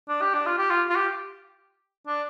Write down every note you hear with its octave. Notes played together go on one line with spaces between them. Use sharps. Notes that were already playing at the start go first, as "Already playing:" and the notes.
D4
G4
D4
F4
G4
F4
F4
G4
D4